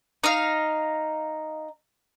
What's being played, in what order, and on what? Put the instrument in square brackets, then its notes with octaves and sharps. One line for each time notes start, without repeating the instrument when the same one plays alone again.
[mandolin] D#4 F5